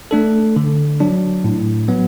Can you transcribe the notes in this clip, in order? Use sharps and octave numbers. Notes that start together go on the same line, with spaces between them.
A3 D4 A4
D3
F#3 D4
A2
F#3 B3